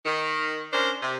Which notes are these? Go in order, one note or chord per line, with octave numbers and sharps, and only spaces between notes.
D#3
C#4 D4 A#4 C5
C3